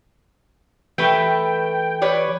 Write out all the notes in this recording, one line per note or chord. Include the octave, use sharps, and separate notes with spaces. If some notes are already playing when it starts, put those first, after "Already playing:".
E3 A3 B4 G5
B4 C#5 D5